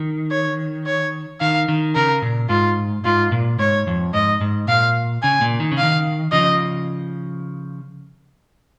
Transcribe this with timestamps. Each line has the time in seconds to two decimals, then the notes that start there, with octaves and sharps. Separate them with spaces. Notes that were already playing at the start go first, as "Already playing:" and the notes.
Already playing: D#3
0.31 C#5
0.86 C#5
1.41 D#3 F5
1.69 D#3
1.95 C#3 A#4
2.22 A#2
2.49 G#2 F4
3.05 G#2 F4
3.32 A#2
3.59 G#2 C#5
3.87 F2
4.14 G#2 D#5
4.41 G#2
4.68 A#2 F5
5.23 C#3 G#5
5.41 A#2
5.60 D#3
5.72 C#3
5.78 F5
5.83 D#3
6.32 C#3 F3 D#5